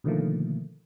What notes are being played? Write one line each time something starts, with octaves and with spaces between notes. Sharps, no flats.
B2 D3 D#3 F3 A3 A#3